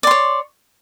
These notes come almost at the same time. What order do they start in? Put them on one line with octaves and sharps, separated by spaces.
D5 C6 C#5